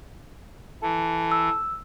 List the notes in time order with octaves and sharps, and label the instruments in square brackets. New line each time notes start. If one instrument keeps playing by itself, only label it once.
[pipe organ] E3 [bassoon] A4
[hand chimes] E6